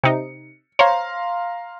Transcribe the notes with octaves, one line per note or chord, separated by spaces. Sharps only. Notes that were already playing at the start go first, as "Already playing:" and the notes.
C3 D#4 C#7
C5 C#5 F5 A#5 C6